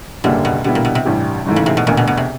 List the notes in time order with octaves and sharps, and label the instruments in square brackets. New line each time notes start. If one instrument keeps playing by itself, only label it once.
[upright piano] F#1 F#2 D3 G3 A#3 [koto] B2
[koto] B2
[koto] B2 [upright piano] D3 G3 B3 E4
[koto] A#2
B2
C3
[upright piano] A1 G2 E3 G3
G#1 G#2 E3 A3
[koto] C#3
C3
B2
[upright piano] E1 D2 D3 [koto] A#2
[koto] B2
B2
C3